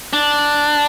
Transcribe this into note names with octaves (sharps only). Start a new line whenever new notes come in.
D4